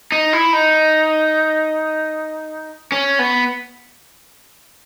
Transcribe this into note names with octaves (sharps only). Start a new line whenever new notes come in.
D#4
E4
D#4
C#4
B3